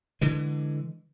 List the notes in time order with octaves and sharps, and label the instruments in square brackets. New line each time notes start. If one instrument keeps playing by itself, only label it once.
[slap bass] D3 E3 G#3